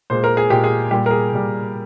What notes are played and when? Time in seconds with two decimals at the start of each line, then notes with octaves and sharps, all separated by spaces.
0.10 A#2 G#3 C5
0.24 A#4
0.37 G#4
0.50 A#2 G#3 G4
0.64 G#4
0.91 A#2 G3 G4
1.06 A#4
1.11 G#4
1.32 A#2 G3